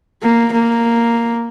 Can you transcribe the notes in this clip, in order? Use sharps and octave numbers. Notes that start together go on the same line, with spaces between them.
A#3
A#3